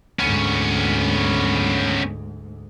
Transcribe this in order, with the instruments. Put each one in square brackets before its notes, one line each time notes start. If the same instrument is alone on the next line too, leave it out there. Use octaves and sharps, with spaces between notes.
[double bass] D2 G#2 [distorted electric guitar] B3 C#4